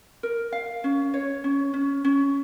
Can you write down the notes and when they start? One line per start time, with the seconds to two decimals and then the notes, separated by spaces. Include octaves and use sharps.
0.23 A#4
0.52 F5
0.84 C#4
1.14 C#5
1.44 C#4
1.74 C#4
2.04 C#4